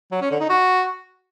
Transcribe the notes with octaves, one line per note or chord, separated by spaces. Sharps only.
F#3
C#4
D3
D#4
F#4